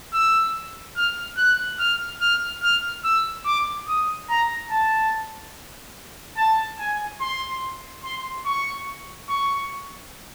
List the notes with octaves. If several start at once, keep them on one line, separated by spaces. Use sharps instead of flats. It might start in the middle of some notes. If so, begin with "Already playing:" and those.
E6
F6
F#6
F6
F6
F6
E6
D6
D#6
A#5
A5
A5
G#5
C6
C6
C#6
C#6